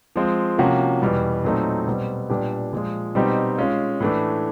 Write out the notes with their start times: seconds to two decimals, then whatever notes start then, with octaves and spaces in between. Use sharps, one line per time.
0.16 F3 G#3 C4
0.58 C3 F3 A#3 C#4 F#4
1.02 E2 B2 G3
1.44 A#2 F#3 A3 C4 D#4
1.87 B2 G3 C4
2.30 A#2 G3 B3 D4 G4
2.73 A#2 F3 G#3
3.15 B2 G3 C4 D#4 G4
3.58 G#3 C#4 F4
4.00 A2 E3 A3 D4